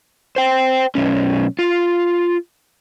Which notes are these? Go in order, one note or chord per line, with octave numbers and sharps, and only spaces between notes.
C5 G5
B1 C#4
F4